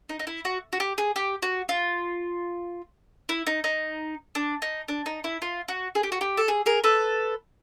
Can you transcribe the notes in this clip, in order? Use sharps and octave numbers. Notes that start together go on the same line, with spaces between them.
D#4
D#4
E4
F#4
F#4
G4
G#4
G4
F#4
F4
E4
D#4
D#4
D4
D#4
D4
D#4
E4
F4
F#4
G#4
G4
F#4
G4
A4
G#4
G#4 A#4
A4 B4